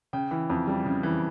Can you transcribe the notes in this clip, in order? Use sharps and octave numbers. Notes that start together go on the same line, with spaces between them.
C#3 G5
E3
F2
G3
C#3
E3